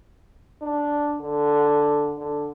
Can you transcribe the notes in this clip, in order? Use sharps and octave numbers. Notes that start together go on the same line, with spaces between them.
D4
D3
D3